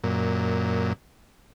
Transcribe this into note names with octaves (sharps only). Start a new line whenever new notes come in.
F#2 A#2